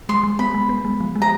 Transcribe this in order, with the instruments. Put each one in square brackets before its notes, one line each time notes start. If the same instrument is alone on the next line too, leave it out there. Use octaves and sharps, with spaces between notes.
[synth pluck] G#3 [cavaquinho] C6
[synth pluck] G#3
[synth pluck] B3 [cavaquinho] B5
[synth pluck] G#3
B3
G#3
F3
G#3
[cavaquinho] A#5